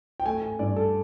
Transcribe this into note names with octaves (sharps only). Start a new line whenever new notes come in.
G5
A3 G#5
G#5
G2 D5
A4